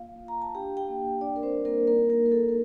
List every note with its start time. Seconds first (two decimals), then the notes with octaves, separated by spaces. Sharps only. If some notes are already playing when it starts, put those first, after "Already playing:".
Already playing: A#3 F4 F5
0.22 F4
0.28 A#5
0.42 A5
0.55 D4 G4 G5
0.77 G4 G5
0.89 A#3
1.21 D4 D5
1.36 A#4
1.43 C4 C5
1.54 G3
1.65 A#3 A#4
1.87 A#3 D#4 A#4
2.10 A#3 A#4
2.21 D#4
2.26 A#4
2.32 A4
2.49 A#4